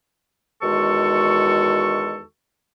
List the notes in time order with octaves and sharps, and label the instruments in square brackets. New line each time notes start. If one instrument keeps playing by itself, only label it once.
[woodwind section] E2 D#3 G#3 F#4 A4 C#6